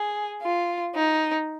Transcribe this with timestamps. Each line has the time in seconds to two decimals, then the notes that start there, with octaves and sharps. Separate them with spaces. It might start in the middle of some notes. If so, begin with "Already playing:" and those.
Already playing: G#4
0.42 F4
0.95 D#4